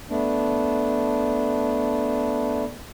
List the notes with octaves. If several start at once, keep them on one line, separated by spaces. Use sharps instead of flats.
A3 B3 D4